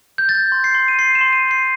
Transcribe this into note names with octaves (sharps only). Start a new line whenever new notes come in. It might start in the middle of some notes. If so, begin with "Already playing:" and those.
G6
G6 A6
C6
C7
C6
D#7
C6 C7
E7
C6
D#7
G6
C7